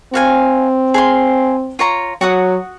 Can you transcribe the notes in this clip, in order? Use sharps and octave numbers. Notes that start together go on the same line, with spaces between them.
C4 F#4 F5 G#5
G#4 F5 C6
F4 C#5 A#5
F#3 F#4 F#5 D#6